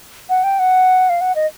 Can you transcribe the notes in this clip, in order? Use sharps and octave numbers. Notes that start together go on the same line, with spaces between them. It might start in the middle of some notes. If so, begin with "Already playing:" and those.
F#5
G5
F#5
F5
F#5
D#5